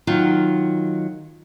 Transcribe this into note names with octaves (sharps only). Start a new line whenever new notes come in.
D#3 F#3 F4